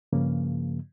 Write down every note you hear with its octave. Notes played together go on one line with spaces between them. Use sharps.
G2 C#3 F3 A#3